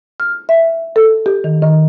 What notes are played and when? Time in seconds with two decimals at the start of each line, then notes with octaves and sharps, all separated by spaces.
0.20 F6
0.49 E5
0.96 A4
1.26 G4
1.44 D#3
1.62 D#3